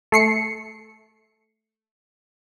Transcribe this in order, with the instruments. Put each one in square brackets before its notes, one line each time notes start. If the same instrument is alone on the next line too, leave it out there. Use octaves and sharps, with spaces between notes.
[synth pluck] A3 C7 C#7